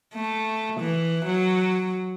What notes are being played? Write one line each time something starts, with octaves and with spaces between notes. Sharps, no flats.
A3
E3
F#3